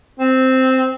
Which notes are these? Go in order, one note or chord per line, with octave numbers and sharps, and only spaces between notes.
C4